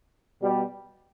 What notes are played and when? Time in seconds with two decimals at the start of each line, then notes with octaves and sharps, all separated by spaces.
0.41 B2 G3